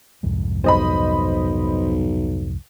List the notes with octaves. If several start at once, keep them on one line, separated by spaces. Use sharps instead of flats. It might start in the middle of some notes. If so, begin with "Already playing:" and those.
C2 F2 G#2
B1 C5 D#5 B5